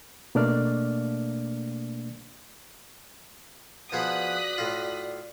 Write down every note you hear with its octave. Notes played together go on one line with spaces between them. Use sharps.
B2 A3 A#3 D4 D5 F6
F3 B3 F#4 G#4 D5 D#6 F#6 B6
A2 F4